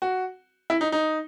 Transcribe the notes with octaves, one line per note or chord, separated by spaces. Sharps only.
F#4
E4
D#4
D#4